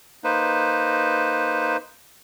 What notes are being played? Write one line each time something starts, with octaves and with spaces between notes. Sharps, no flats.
A#3 D#4 B4 C5